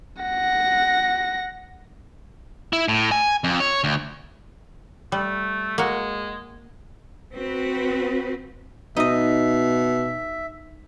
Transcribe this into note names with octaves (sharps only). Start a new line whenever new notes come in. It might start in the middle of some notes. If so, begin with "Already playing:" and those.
F#5 A#6
E4
A2
G#5
F2
C#5
D2
G3 A3
G#3 A#3 F#4
C4 F#4 B4
B2 D#4 D#5 E5